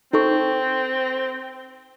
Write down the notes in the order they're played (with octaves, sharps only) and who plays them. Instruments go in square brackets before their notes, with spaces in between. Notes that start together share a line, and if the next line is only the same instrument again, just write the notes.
[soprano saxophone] C4 [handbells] D#4 A4 C#6